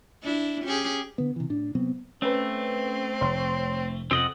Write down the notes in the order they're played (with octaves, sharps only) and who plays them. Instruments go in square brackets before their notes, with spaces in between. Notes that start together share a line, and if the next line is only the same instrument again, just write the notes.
[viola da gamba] D4 E4
C#4 G4 G#4
[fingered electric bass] D3 B3
C3 E3
A2 D4
C3 F#3 B3 C4
[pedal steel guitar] A3 [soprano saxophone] C4 [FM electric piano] C#4 B4
[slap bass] F1 [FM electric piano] C#5 C6
[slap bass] F2 [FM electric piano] C3 [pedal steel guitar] C4 D#5 F#5